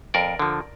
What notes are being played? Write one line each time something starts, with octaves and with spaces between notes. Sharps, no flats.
F2 A#4 D5
D3 F3